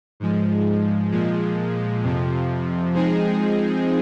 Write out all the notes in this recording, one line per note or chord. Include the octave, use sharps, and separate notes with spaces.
G#2 F3 G#3
A#2 F3 G#3
F2 C3 F3
F3 G#3 C4 D#4 G#4